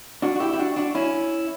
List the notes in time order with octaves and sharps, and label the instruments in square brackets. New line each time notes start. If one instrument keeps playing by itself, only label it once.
[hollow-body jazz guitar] D4 F#4
F#4
E4 G4
E4
D4 F#4
D4 F#4
C#4 E4